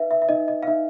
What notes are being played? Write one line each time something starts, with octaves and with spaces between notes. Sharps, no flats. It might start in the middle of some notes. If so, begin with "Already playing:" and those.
Already playing: D#4 B4 E5 F5
E5
E5
D#4 D#5
D#5
F5
D#4 E5